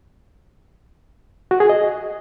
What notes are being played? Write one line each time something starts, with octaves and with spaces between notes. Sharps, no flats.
F#4
G#4
D#5